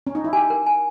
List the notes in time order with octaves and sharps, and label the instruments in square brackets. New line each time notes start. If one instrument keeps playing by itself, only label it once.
[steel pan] C#4
D#4
E4
[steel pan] G4 [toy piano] G#5
[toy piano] A#4
G#5